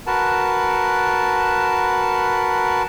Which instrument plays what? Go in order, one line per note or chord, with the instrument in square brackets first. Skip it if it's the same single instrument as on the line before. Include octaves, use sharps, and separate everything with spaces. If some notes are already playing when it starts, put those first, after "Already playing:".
[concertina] F#4 A#4 B4 A5